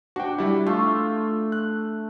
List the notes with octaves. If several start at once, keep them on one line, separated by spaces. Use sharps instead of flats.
D4 F#4 G5
G3 E4
A3 F4
F#6